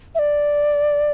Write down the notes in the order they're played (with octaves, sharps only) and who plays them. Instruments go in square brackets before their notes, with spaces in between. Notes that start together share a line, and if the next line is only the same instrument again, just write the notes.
[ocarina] E5
D5